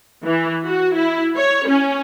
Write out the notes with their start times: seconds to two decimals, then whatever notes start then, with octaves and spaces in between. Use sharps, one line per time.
0.24 E3
0.66 F#4
0.95 E4
1.36 C#5
1.66 C#4